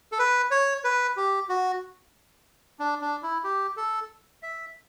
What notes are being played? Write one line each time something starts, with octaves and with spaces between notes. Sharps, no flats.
A4
B4
C#5
B4
G4
F#4
D4
D4
E4
G4
A4
E5